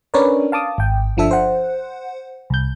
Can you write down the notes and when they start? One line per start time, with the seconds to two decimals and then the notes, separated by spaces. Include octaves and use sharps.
0.14 C#4 D4 A#4 B4 C#5 D5
0.52 F5 A5 D6 D#6
0.78 G#1 G5
1.17 G1 F3 D4 A4 E5
1.31 C5 F#5
2.50 C2 G6